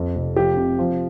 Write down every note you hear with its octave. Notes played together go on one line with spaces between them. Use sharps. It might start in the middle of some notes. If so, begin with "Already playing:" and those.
Already playing: F2
F1
F3 G4
C3
F3